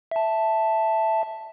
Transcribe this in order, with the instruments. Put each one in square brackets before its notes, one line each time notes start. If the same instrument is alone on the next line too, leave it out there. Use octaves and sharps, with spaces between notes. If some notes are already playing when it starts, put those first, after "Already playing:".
[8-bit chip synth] E5 A5